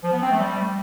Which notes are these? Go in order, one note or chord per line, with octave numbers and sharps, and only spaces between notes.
F3
B3
C4
A3
G3